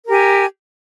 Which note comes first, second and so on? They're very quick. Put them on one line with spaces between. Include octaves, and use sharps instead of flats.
A#4 G4 G#5